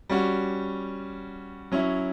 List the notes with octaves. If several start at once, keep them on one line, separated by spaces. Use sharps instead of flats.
G3 C#4 F#4
F#3 C#4 E4